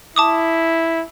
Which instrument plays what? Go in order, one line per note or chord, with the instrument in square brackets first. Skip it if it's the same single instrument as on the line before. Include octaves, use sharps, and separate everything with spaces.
[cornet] E4 [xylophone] A5 D6 D#6